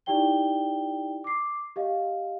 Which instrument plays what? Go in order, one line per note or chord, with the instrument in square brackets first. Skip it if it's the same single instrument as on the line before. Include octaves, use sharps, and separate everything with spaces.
[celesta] D#4 E4 G4 D5 G5 G7
D6 C7
G4 D#5 F5